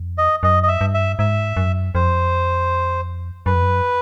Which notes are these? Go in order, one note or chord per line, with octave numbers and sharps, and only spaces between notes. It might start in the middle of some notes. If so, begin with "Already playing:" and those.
Already playing: F2
D#5
F#2 D#5
D#5
E5
G2
E5
G#2 E5
F#2
F2 C5
F#2 B4
F2
F#2